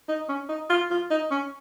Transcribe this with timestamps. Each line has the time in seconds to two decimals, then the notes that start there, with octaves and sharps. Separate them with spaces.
0.09 D#4
0.29 C#4
0.49 D#4
0.70 F4
0.91 F4
1.11 D#4
1.31 C#4